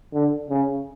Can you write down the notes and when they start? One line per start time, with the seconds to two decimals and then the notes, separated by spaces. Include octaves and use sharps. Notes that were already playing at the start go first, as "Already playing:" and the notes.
0.14 D3
0.50 C#3